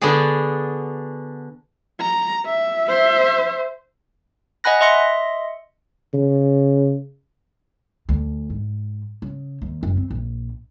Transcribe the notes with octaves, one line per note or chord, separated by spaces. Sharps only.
D3 B3 D4 F#4 G#4
A#5
E5
C5 E5
D#5 F#5 G#5 B5 F#6 A#6
D#5 E5 C6 A#6 C#7
C#3
D2
G#2
C#3
D#2
F#1
C4
A#1